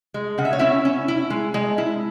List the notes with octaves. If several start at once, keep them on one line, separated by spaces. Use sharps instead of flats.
G#3
C#3 F#5
E5
C#5
C#4 E4 E5
C#4
E4
G#3
G#3
E4